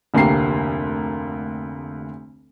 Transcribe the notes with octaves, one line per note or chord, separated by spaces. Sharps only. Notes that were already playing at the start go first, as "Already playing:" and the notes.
F1 D2 A#3 G4 C7